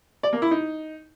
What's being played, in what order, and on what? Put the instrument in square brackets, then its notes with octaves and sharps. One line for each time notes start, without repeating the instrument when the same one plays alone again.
[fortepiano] D5
A#3
E4
D#4